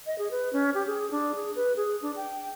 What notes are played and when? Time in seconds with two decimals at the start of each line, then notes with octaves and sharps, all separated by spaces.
0.06 D#5
0.18 G#4
0.31 B4
0.53 C#4
0.74 G4
0.87 G#4
1.11 D4
1.35 G#4
1.56 B4
1.76 G#4
2.02 D4
2.16 G5